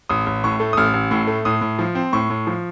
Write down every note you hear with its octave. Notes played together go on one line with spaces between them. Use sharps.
A1 D#6
A1
A2 C#6
A3
D#6
A1 F6
A1
A2
A3
A2 D#6
A2
F3
C4
A2 C#6
A2
F3